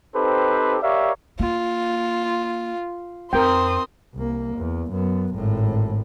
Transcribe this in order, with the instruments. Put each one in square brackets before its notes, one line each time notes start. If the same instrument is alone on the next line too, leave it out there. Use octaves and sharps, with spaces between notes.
[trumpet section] C4 D#4 G4 A4 B4 C5
G4 A#4 C#5 D5 E5 F5
[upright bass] A#3 [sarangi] F4
[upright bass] F2 [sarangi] C4 [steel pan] A#4 G5 [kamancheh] C6 D#6
[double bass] C2 A#3
E2
F#2 B3
G#1 A2